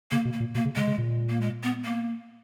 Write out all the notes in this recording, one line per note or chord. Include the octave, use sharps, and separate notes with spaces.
C#3 A#3
B2
A#3
A#2
B2 A#3
C#3
C#3 G#3
C#3
A#2
A#3
G#3
B3
A#3